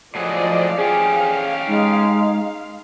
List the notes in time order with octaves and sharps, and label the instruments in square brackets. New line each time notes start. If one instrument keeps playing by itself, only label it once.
[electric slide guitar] A2 F#3 G#4 [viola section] F3 D5 D#5
[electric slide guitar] C#4 G4 [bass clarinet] G#4 [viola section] F5
[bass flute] G#3 [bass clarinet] D#4